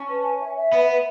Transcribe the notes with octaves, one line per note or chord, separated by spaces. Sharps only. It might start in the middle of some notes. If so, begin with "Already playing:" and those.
Already playing: C#4 A5
B4
G#5
E5
E5
B3 B4
E5